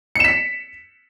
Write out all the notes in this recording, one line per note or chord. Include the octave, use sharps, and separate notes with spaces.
B6 C#7 E7